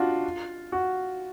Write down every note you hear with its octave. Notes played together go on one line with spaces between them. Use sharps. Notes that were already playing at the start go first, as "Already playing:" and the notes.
Already playing: D4 F4 F#4
F#4